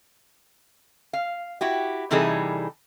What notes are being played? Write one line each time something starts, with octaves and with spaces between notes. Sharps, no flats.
F5
E4 F#4 G4
C3 E3 G3 D#4 G#4 A4